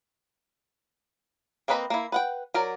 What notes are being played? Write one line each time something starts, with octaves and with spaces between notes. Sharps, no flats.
A#3 C4 B4 D#5 B5
A#3 E4
B4 F#5 G5
F#3 A#4 D5